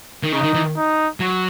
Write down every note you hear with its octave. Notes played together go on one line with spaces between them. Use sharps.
D#3
C#3 D#4
D#3
E3
D#4
F#3